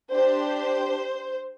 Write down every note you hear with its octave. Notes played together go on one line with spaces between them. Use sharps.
D4 G4 C5